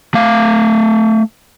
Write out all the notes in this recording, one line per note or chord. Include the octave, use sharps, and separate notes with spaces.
A3 F5